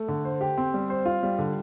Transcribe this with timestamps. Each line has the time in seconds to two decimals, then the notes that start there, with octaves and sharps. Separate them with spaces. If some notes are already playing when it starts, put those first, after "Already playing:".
Already playing: A3
0.08 D3
0.25 C5
0.41 G4
0.57 C4
0.74 G3
0.90 C5
1.06 F4
1.23 G3
1.39 D3